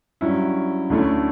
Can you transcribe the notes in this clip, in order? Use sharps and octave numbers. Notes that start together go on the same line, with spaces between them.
G2 F#3 C#4 E4
D2 D3 A3 C#4 E4